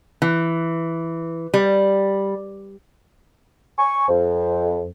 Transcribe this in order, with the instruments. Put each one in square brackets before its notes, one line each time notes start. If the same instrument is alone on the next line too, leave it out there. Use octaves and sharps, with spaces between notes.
[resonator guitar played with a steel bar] E3
G3
[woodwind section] G#5 C#6
F2